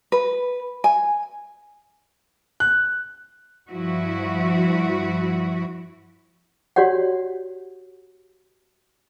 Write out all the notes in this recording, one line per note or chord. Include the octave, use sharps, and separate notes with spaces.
B4
G#5
F#6
G2 F3 E4 F#4
F#4 G4 C#5 D5 F#5